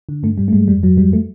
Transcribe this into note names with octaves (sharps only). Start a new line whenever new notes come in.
D3
G2 A3
G2 G3
A3
G2 G#3
F2 G3
F2 F#3
F2 G3
A3